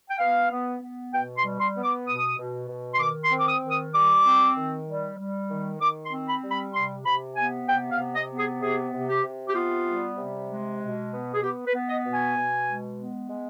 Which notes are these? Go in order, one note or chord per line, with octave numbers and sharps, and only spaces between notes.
G5
B3 F5
B3
B3
B2 G5
C6
G3
C6
B3
D6
B2 D#6
B2
B2
C6
D#3 D6
C6
C4
D6
D#6
D#3
D#6
G3 D6
C4
D#3
G3
G3
D#3
D#3 D6
C6
C4
B5
G3
B5
C3 C6
C3 B5
B3 G#5
C3 G5
F5
C3
D#5
B3
G#4
C3 G#4
C3
G4
C3
G4
B3 F4
G3
C3
G#3
B2
B3
G#4
B3 G4
B4
B3
D#5
B2
G#5
B2
G#3
B3
G#3